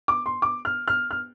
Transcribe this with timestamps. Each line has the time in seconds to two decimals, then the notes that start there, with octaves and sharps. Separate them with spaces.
0.08 D6
0.26 C6
0.42 D6
0.65 F6
0.88 F6
1.11 F6